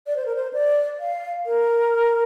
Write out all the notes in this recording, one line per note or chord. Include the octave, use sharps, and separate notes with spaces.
D5
C5
A#4
C5
D5
F5
A#4